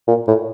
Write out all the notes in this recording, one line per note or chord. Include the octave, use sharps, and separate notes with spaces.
A#2
A2